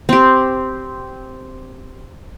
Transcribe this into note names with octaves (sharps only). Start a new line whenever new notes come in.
C4 G4